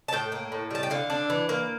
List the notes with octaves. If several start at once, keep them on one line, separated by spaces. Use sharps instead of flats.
A5
A2 G5
A#3
A2
G3 A5
G5
D3 F5
D4
E3
A#3